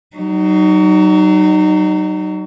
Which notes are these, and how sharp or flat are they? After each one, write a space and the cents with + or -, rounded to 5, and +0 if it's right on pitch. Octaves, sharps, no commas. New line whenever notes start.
F#3 +30 D#4 -20